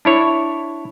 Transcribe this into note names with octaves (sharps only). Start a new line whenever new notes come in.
D4 E4 C#5